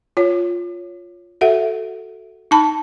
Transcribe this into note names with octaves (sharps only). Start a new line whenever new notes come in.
F4 C#5
F#4 A4 E5 F#5
D#4 A5 B5